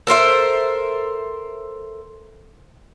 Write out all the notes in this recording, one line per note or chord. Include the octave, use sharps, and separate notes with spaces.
A4 A#4 C5 E5